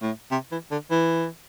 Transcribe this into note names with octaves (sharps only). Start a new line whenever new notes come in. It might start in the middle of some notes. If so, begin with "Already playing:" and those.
A2
C3
E3
D3
E3